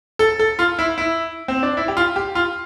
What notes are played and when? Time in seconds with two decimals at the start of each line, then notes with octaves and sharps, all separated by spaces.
0.19 A4
0.39 A4
0.59 F4
0.79 E4
0.98 E4
1.48 C4
1.63 D4
1.77 E4
1.88 G4
1.97 F4
2.16 G4
2.35 F4